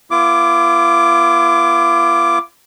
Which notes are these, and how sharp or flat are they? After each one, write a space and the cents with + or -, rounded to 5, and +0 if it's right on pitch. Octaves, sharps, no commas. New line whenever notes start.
B3 -40 F4 -45 D6 +0